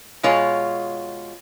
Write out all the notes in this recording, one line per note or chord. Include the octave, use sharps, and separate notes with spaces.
B2 G#3 F4 C#5